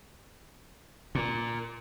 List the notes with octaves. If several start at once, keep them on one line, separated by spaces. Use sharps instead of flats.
A#2